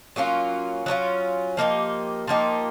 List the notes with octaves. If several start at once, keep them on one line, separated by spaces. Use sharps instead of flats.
F#3 A#3 C#4 F4
F#3 A#3 C#4 F4
F3 A#3 D#4 G4
F3 A#3 D#4 G4